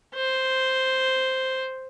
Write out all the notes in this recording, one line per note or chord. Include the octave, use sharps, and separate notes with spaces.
C5